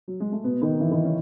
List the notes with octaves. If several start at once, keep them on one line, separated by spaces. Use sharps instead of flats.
F#3
G#3
A3
B2 B3
D#3 D#4
E3 E4
D#3 D#4
C#3 C#4